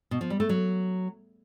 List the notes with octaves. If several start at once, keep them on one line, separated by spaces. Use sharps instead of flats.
B2
F3
G3
A3
F#3